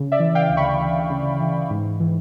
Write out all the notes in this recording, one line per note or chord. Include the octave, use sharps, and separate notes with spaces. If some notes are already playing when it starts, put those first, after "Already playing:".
Already playing: C#3
D5 E5
E3
F5 G5
D2
B5 C#6
D2
C#3
E3
G#2
E3